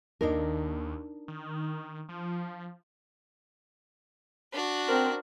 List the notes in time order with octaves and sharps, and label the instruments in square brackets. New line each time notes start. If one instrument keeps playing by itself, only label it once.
[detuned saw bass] D#2 [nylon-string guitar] D4 D#4 A#4
[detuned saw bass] D#3
F3
[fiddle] D4 F#4
[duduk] C4 [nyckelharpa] A#4 C5